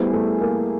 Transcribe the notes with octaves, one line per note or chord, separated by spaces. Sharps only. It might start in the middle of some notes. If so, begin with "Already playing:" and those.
Already playing: G3 A3 B3 E4 G#4 C5
A3
A#3